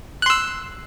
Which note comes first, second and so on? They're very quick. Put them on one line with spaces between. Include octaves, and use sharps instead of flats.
F#6 C6 E6